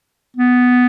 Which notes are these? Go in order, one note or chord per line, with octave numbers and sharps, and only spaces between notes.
B3